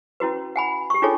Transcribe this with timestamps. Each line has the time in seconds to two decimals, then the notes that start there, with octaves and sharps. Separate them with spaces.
0.20 C#4 E4 F#4 B4
0.56 F#5 G#5 B5
0.90 G4 C#6
1.02 D4 D#4 F4 G#4 A4 C#5